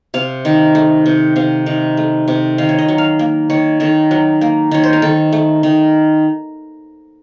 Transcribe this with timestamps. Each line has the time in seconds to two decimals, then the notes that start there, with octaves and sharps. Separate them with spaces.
0.14 C3 F5
0.45 D#3
0.75 A3
1.06 C3
1.36 C3 F5
1.66 D#3
1.97 A3
2.28 C3
2.58 D#3 F5
2.69 C#5
2.78 D#5
2.88 F#3
2.98 F5
3.19 A#3
3.50 D#3 C#5
3.80 D#3 A4
4.11 F#3
4.41 A#3
4.71 D#3 C#5
4.83 C5
4.93 A#4
5.02 D#3 A4
5.33 A3
5.63 D#3